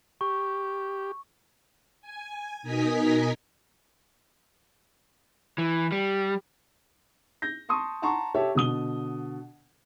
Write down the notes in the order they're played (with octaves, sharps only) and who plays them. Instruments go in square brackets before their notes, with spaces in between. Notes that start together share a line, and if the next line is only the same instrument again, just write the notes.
[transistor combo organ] G4 [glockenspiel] C#6
[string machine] G#5
B2 D#4 A#4 D#5 G#5 B6
[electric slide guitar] E3
G3
[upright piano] G6 A#6
A5 C6 C#6 D#6
F#5 A5 A#5 C6 C#6
G4 A4 C#5 E5
B2 D3 D#6 G7